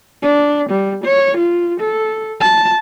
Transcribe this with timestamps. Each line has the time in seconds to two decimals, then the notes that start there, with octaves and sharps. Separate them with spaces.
0.22 D4
0.70 G3
1.04 C#5
1.37 F4
1.80 A4
2.41 A5